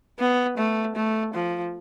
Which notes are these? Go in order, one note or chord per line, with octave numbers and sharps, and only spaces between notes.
B3
A3
A3
F3